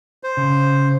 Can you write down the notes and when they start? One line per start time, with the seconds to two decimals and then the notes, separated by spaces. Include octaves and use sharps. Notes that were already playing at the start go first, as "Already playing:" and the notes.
0.23 C5
0.37 C#3